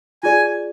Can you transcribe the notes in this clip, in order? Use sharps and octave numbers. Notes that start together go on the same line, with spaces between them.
F4 G#4 D5 G#5